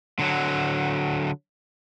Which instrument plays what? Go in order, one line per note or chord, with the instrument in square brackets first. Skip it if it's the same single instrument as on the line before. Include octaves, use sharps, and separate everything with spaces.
[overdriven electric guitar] D3 F#3